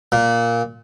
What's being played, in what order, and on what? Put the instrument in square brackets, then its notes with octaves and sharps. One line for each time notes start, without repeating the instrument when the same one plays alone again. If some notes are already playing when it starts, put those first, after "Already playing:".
[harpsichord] A#2